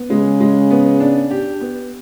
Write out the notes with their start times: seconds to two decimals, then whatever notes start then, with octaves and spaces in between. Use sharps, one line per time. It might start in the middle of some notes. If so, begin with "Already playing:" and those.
Already playing: B3
0.10 C#3 G#3
0.40 G#3
0.71 B3
1.00 D4
1.31 G4
1.61 B3